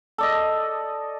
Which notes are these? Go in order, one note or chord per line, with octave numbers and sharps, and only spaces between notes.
A4 D5 D#5